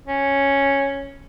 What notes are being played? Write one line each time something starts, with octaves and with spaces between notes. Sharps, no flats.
C#4